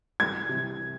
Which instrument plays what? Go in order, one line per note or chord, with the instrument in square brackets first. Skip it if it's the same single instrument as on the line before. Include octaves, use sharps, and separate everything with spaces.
[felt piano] C2 [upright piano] G#6
[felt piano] C3 E3